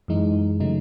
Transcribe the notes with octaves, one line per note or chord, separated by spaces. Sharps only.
F#2 E3 G#3 D#4
C#3 F#3 A3 D#4